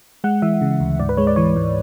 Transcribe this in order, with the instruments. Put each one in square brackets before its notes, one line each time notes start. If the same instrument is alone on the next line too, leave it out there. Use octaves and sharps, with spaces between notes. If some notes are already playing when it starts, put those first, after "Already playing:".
[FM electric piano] G#3 F#5
E3 E5
C#3
D2
G#2 D5
B4
G#3 C#5
D5
E3 C#5
G#2